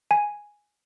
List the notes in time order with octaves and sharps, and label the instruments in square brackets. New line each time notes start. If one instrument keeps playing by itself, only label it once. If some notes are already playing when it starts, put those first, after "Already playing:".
[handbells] G#5